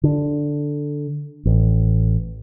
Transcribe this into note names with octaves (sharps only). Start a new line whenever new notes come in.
D3
A1